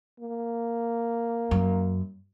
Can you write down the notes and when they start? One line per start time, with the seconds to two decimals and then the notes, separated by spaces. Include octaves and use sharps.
0.20 A#3
1.51 F#2